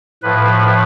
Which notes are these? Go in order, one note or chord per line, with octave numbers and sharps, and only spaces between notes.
A2 F3 B4